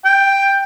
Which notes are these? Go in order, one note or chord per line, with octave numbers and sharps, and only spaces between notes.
G5